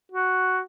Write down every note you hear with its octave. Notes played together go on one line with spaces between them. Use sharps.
F#4